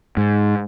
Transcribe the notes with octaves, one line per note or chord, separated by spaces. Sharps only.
G#2